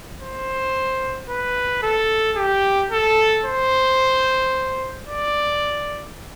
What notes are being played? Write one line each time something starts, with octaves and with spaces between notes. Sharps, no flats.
C5
B4
A4
G4
A4
C5
D5